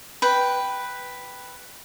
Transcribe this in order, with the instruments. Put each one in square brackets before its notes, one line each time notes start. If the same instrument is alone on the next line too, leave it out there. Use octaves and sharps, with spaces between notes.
[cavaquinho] B4 G5